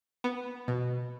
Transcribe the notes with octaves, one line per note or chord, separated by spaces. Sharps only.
B3
B2